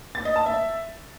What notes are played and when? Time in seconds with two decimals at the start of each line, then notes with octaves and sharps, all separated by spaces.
0.15 A6
0.25 D#5
0.36 A5
0.46 E5